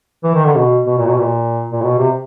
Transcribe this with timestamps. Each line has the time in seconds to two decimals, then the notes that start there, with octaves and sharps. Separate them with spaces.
0.24 E3
0.35 D#3
0.45 D3
0.56 B2
0.87 B2
0.98 A#2
1.08 B2
1.19 A#2
1.72 A#2
1.82 B2
1.98 C3